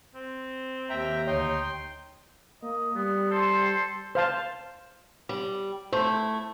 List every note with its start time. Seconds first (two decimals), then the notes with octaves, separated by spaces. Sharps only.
0.15 C4
0.90 D#2 E5 G5 A#5
1.27 D2 D#4 C#5 G5 C6
2.62 A#3 D#5
2.96 G3 B3
3.31 A4 C5 C6
4.15 C5 F5 A5
5.29 G3
5.93 A3 E4 C5